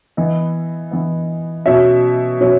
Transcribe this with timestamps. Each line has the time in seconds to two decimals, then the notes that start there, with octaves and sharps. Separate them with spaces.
0.17 E3 B3 D#5
0.91 E3 B3
1.66 B2 F#3 C#4 E5
2.40 B2 F#3 C#4